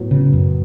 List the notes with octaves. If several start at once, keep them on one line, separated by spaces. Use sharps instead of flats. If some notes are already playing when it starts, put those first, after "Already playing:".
Already playing: A2 F#3 B3
C#3
F#2